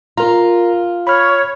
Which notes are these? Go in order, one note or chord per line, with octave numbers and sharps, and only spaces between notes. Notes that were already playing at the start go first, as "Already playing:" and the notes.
F4 A#4 A#5
C#5 B5 F6